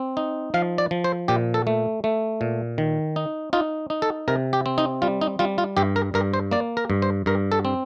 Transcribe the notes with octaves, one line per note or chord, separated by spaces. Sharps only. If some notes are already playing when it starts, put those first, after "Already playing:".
Already playing: C4
D#4
F3 F5
D5
F3
C5
A#2 G4
A4
A3
A3
A#2
D#3
D#4
D#4 F4
D#4
A4
C3 A#4
G4
C4
D#4
G3 F4
D#4
G3 F4
F4
G2 G4
A#4
G2 A#4
C5
A#3 D5
A#4
G2
C5
G2 A#4
A4
C4